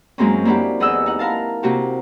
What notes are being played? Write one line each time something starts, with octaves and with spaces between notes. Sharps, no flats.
F#2 G#3 A#3 C4 C#4
A#3 D4 E4 F#4 G4
E2 G#4 D#5 F#5 E6 G6
D#4 F#5
E4 A#4 F5 A5
C3 A#3 F#4 G4